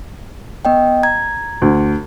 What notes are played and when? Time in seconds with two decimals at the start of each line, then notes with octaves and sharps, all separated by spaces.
0.65 B3 D#5 G5
1.03 A#5 G#6
1.62 D2